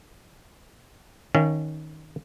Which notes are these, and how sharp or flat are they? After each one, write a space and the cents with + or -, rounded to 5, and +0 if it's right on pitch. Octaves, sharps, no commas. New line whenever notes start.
D#3 +0 C#4 +0 F5 -45